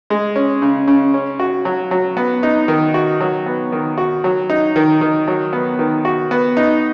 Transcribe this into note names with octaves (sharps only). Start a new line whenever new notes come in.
G#3
C#4
C#3
C#3
C#4
F#4
F#3
F#3
B3
D#4
D#3
F#4
F#3
B3
D#3
F#4
F#3
D#4
D#3
D#3
F#3
B3
D#3
F#4
B3
D#4